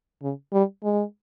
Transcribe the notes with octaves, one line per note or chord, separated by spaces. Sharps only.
C#3
G3
G#3